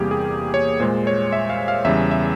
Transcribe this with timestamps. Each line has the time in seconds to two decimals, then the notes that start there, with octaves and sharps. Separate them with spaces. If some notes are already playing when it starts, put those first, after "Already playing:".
Already playing: E2 C3 G3 A#3 G4 G#4
0.11 G#4
0.54 C#5
0.80 A#2 G#3 C5
1.07 C#5
1.32 E5
1.50 F5
1.68 F5
1.85 E2 C#3 G3 E5
2.11 E5